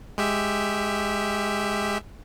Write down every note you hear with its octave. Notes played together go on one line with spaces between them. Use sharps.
G#3 G4 E5